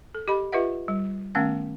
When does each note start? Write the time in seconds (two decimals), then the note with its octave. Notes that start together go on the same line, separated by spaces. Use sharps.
0.15 A4
0.28 G4 D#5 B5
0.52 F4 G4 B4 D#5 E5 F#5
0.88 G3
1.35 D#3 A3 B3 C#4 F5 F#5